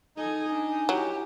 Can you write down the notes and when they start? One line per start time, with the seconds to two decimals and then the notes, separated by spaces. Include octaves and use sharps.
0.17 D#4 A4 G#5
0.49 D4 G#5
0.89 F#3 E4 G4